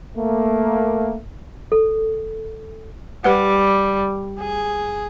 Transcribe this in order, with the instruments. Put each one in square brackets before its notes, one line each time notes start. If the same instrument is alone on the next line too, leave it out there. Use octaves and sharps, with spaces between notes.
[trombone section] A3 A#3
[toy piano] A4
[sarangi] G3 [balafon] G4 B4 F#5
[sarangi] G#4